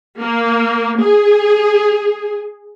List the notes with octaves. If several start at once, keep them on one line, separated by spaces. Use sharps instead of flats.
A#3
G#4